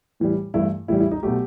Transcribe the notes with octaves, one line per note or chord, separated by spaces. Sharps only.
A2 E3 G3
G2 E3 A3 E4
A2 E3 G3 E4
E4
D#4
B2 F#3 A3 G4